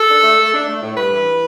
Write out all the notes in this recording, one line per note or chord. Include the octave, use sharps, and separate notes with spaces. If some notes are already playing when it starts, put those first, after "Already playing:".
Already playing: A4
D4
A3
A3
D4
A3
A2
G2 B4
E3
E3